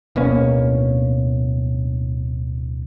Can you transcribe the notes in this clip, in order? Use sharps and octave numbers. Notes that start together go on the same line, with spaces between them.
D1 B2 A#3 C#4